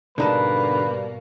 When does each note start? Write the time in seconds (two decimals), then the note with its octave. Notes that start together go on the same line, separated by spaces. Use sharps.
0.18 G#2 B2 D3 G3 A#3 D#4 B4 A5